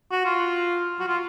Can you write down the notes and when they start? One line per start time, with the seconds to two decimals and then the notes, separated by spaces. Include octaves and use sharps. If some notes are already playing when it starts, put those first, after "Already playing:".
0.11 F#4
0.25 F4
1.00 F#4
1.08 F4